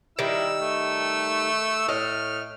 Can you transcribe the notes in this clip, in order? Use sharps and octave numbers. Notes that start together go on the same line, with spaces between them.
D#3 G3 D#4 E4 E6
A3
A2 D#5 F6